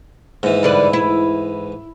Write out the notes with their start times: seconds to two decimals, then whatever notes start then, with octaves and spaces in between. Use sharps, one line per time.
0.43 D#2 G#2 E3
0.63 G2 D3 B4
0.93 E4